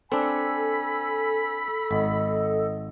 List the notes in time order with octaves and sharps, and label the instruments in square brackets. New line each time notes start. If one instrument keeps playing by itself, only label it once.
[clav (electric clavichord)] C4 D4 [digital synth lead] A4 [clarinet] G#5 [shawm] B5
[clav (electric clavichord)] G#1 [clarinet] D#5